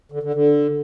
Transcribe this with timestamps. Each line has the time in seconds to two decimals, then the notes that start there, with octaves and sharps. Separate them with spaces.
0.12 D3
0.23 D3
0.34 D3